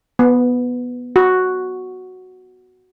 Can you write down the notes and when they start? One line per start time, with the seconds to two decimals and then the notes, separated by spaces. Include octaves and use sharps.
0.19 B3
1.16 F#4